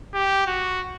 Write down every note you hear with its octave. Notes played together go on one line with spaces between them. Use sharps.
G4
F#4